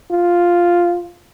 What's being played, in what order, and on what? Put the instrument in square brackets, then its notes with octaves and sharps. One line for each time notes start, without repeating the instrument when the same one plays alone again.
[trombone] F4